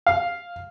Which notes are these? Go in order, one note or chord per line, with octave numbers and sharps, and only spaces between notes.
F5